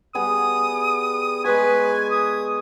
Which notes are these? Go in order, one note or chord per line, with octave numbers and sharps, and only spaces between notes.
G3 B3 G#4 D#6
G#3 B4 G#5 C#6
D#6